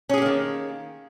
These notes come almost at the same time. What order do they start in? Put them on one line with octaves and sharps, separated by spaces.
C#4 G#4 G4 A#3 D#3